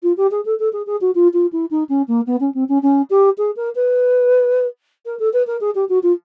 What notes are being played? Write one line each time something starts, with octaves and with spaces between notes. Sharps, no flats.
F4
G4
G#4
A4
A4
G#4
G#4
F#4
F4
F4
E4
D#4
C#4
A#3
B3
C#4
C4
C#4
C#4
G4
G#4
A#4
B4
A#4
A4
B4
A#4
G#4
G4
F#4
F4